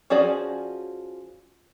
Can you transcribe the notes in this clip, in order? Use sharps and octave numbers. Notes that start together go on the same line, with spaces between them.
F3 C#4 F#4 G#4 D5